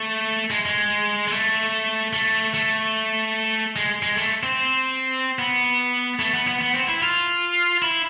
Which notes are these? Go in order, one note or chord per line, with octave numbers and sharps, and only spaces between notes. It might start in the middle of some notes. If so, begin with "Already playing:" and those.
Already playing: A3
G#3
G#3
G#3
A3
A3
A3
G#3
G#3
A3
C4
B3
A3
B3
B3
B3
C4
E4
F4
E4